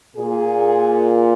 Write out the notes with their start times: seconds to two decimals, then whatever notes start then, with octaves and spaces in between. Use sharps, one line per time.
0.16 A#2 G#4